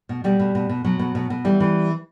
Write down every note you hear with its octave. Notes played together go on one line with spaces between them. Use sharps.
B2
B2 G3
B2
B2
B2
B2 F#3
B2
B2
B2
E3 G3
E3